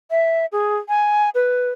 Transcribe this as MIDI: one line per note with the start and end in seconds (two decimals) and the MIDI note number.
0.11 0.46 76
0.52 0.76 68
0.88 1.30 80
1.35 1.70 71